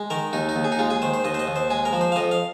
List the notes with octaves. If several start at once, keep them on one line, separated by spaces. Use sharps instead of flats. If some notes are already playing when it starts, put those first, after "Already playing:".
Already playing: G#3
D#3 A#4
D#2 D#4
D#4
D#2
G#4
D#4
G#3 F4
G#4
D#3 C5
C5
D#2 D#5
C5
D#5
D#2
C5
G#3 G#4
A#4
F3
C5
F5
F2 D#5
F5